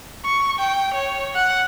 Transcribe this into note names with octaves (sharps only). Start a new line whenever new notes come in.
C#6
G5
C#5
F#5